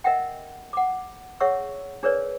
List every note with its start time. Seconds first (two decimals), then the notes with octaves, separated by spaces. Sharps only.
0.04 A#4 D#5 E5 F#5 G5
0.73 F#5 D6
1.40 G#4 C#5 E5 F#5 C#6 E6
2.03 D4 G#4 A#4 B4 C#5 D5